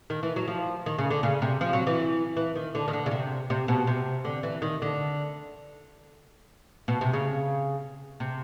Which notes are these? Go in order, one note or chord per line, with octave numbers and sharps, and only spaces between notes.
D#3
E3
F#3
F3
D#3
C#3
D3
C#3
C3
F3
F#3
E3
E3
D#3
D3
D#3
D3
C#3
C3
C3
B2
C3
D3
E3
D#3
D3
B2
C3
C#3
C3